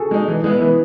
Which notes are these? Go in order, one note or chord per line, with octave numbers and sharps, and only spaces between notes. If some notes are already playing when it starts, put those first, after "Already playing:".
Already playing: F#4 G#4 A4
G#3 D#4
E3
G#3 B3 E4
E3 B4